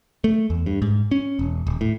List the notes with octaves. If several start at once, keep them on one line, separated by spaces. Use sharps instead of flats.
A3
E2
G2
G#2
C#4
E1
D#1
A2